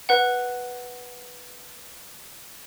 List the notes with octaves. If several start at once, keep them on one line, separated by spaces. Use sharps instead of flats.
B4 F#5